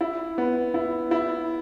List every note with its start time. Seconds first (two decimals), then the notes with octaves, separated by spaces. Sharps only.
0.01 E4
0.38 B3
0.74 E4
1.11 E4